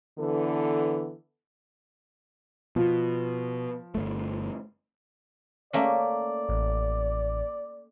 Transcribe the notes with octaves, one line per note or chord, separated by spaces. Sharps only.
D3 E3 B3 A4
B2 F3
G1 D#2 A3
A3 A#3 C#4 D5
A1